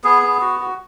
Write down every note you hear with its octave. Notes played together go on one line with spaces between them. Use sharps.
B3 G#4
B3
F#4
F#4